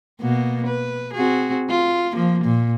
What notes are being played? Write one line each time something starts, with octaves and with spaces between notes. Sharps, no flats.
B2 A#3 B3
B4
C4 F#4 G#4
F4
F3 A#3
A#2